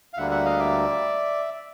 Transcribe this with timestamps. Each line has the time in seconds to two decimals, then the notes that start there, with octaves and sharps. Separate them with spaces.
0.13 F5
0.17 D2 D3 G3 A#3 E5 F#5
0.31 E5 F#5
0.45 D#5 F5
0.59 D5 E5